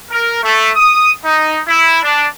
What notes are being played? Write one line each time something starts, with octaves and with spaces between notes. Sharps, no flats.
A#4
A3
D#6
D#4
E4
D4